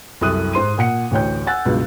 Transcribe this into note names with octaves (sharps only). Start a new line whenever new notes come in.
C2 F#2 A4 D#6 F#6 D#7
G#2 C5 C6 D#7
A#2 F#5 C#7
A1 D2 C#5 G5 G6
F#5 G#5 E6 F#6 A6
C#2 G2 B2 F#3